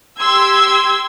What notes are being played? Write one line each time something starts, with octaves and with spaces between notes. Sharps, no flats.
G4 C6 E6 G#6